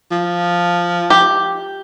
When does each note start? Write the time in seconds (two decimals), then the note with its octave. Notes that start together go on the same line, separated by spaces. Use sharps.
0.11 F3
1.10 G4